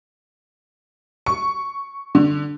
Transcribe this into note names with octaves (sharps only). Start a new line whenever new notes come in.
C#6
D3